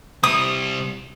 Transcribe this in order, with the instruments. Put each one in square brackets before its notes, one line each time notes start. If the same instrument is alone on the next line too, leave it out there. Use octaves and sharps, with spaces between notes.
[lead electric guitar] C3 G3 [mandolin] D#6